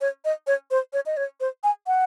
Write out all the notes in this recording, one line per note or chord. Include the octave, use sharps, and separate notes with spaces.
C#5
D#5
C#5
C5
C#5
D#5
C#5
C5
G#5
F#5